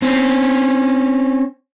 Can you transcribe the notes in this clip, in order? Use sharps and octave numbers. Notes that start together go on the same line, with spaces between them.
C4 C#4